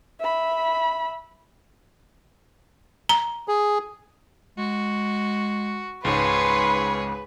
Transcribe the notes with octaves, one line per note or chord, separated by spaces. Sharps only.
E5 B5
A#5
G#4
G#3 F#4
C#2 G#2 C#3 G#4 B4 C#5 C6